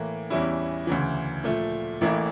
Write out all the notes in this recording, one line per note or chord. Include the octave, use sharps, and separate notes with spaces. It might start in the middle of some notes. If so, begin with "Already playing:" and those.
Already playing: A2 E3 A#3
E2 E3 G3 C#4 E4
D2 C#3 E3
A#2 F3 A3
A1 A2 E3 A#3 E4